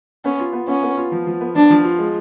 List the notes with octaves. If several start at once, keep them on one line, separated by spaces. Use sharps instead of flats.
B3 C#4
F4
B3
B3 C#4
B3
F4
F3
F3
B3
F3 D4
F3
F4
G#3